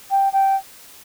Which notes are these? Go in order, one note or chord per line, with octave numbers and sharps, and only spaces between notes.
G5
G5